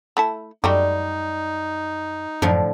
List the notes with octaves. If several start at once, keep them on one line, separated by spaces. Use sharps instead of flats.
A3 E4 A5
F#2 G3 A3 D#4 F#4 G4
F#2 A2 D3 F3